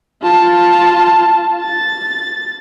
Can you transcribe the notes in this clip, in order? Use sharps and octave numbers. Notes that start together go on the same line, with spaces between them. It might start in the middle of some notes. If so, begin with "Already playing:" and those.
F4 A5
A6